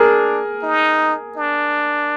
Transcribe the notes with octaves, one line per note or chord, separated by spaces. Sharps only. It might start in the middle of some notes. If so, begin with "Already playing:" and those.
Already playing: D4 G#4 A#4
D#4
D4